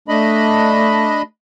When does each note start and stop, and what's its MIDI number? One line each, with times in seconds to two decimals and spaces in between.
0.08 1.25 57
0.08 1.22 62
0.08 1.22 75
0.08 1.22 83